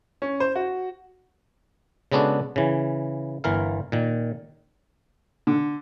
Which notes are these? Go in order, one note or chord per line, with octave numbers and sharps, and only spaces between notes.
C#4
C5
F#4
C#3 G#3 B3 D4 F#4 A4
C#3 E3
G1 E3 A#4 F5
A#2 D#3
D3